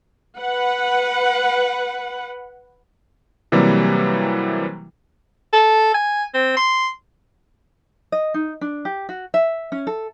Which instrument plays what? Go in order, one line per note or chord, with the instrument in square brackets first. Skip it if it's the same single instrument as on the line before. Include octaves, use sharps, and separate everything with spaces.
[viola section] B4 F#5
[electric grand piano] C3 E3 F#3 G3 A#3
[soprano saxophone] A4
G#5
C4
C6
[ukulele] D#5
D#4
D4
G4
F#4
E5
C#4
A4